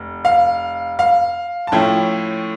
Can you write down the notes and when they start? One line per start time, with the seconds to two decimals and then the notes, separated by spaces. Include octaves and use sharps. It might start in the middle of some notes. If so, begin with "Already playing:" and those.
Already playing: F1
0.25 F5
0.99 F5
1.67 A5
1.72 A2 F3 C#4 E4 G5